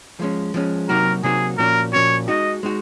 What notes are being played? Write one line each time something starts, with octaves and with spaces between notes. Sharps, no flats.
F3 G#3 C#4
F3 G#3 C#4
C3 F#3 A#3 D#4 F#4 A#4
C3 F#3 A#3 D#4 F#4 G#4
A#2 F3 A#3 C#4 F#4 A#4
A#2 F3 A#3 C#4 F#4 C#5
G#3 D#4 F#4 D#5
G#3 D#4 F#4